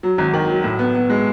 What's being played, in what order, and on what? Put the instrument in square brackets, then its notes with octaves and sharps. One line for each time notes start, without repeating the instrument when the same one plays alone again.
[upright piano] F#3
G#1
D#3
F#3
A2
B3
B3
G#3